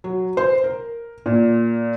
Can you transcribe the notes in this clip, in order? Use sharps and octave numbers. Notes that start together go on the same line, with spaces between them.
F#3
C5
A#4
A#2